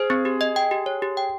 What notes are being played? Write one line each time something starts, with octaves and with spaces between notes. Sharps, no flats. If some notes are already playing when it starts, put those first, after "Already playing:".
Already playing: G#4 C5
C4
G4
D#5
G5
G4
C#5
G4
G5